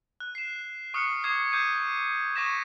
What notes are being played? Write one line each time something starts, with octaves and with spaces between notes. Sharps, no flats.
F#6
C7 E7
C#6 D#6 F6 F#6 C#7
D6 D#6 G#6 C7
D6 G6 G#6 C7 D#7
C#6 D#6 G6 A#6 B6 E7